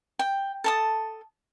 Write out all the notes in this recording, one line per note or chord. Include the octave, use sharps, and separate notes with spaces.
G5
A4 A5 D#6